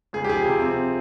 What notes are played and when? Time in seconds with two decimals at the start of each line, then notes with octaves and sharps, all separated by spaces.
0.13 C#2 G#4
0.24 G4
0.29 F3 G#4
0.46 C3
0.62 C4